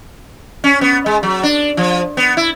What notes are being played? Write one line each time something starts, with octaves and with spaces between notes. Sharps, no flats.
C#4
B3
G#3
F#3
D4
F3
B3
E4